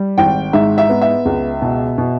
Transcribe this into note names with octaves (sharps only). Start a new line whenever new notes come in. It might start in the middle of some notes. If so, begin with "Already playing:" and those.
Already playing: G3
G#1 G5
G#2 E5
E5
B3
E5
C#2
B2
B2